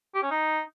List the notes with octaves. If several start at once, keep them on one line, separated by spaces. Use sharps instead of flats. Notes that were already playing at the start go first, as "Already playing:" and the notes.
G4
C#4
D#4